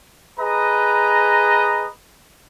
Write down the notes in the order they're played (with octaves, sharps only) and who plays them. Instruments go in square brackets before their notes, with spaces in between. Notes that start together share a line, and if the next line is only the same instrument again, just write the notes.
[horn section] G#4 B4 D#5 A#5